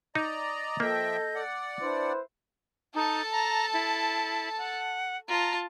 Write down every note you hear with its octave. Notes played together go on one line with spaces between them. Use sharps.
D#4 D5 D#5 A#5
F3 A#3 A4 D#5 E5 G5 G6
D5 F#5
D4 E4 B4 C5
D#4 A4 A5
A#5
E4
F#5
F4 A5 A#5